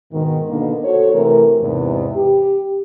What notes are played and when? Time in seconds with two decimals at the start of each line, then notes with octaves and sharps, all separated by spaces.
0.12 G#2 B2 D#3
0.49 B2 D3 A#3 D#4
0.84 F#4 A4 C5 C#5
1.13 C3 E3 A3 A#4
1.61 E2 G#2 C3
2.14 G4